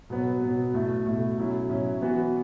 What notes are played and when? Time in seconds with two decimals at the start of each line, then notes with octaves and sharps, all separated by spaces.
0.10 B2 F#3 B3
0.41 B2 F#3 B3
0.74 B2 A3 E4
1.06 B2 A3 E4
1.38 B2 F#3 C#4 E4
1.69 B2 F#3 C#4 E4
2.02 E3 B3 F#4